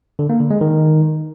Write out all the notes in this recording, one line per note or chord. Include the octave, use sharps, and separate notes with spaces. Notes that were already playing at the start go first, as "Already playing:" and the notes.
D3
A#3
D3
G#3
D#3